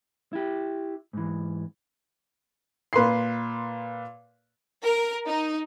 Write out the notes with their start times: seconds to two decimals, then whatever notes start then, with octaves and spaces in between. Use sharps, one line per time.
0.33 E4 G4
1.13 G#2 E3
2.93 A#2 B4 C6 C7
4.83 A#4
5.27 D#4